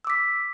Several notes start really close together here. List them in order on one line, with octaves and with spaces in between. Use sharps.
E6 D6 B6